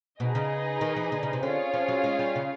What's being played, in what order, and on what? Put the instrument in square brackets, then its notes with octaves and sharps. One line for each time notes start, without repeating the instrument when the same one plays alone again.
[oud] B2 [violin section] D#4 G#4 B4 D#5
[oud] C#3
D#3
E3
D3
C#3
C3
[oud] D3 [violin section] C#4 F4 G#4 C#5 F5
[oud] F3
F#3
G#3
G3
C#3